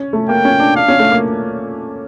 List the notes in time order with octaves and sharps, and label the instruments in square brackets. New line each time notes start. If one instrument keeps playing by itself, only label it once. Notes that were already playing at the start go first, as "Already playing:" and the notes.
Already playing: [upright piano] C#4
A3
[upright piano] A#3 [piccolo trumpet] G5
[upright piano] C#4
D4
[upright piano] D4 [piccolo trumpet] F5
[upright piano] C#4
A3
A#3